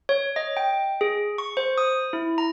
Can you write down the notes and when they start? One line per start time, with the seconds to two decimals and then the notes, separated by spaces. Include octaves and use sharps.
0.09 C#5
0.36 D#5
0.57 G5
1.01 G#4
1.38 C#6
1.57 C5
1.78 D#6
2.13 E4
2.38 A#5